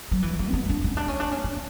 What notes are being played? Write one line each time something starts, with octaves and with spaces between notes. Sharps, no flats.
F#3
E3
F#3
C#4
B3
D4
C#4
D4
C#4
D4
C#4
D4